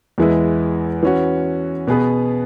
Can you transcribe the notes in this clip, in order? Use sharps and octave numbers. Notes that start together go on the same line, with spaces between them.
E2 E3 G#3 B3 E4
E3 C#4 F#4
B2 B3 G#4 B4